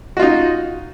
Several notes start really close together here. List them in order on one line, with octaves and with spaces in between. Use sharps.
F#4 F4 D#4